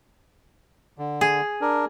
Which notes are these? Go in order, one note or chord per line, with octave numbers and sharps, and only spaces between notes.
D3
G#4
D4 A#4